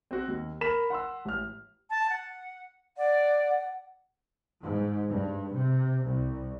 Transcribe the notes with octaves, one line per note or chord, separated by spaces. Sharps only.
C4 F#4
D#2
A#4 B5 B6 E7
F#5 C6 E6
A1 F6
A5
F#5
D5 F#5
G#2
G2
C3
C2